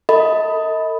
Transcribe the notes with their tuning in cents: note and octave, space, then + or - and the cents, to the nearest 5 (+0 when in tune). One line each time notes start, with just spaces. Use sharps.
A4 +45 D#5 +35 B5 +0